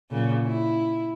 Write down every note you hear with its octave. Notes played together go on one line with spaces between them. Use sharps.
A#2 C#3 F#3
E4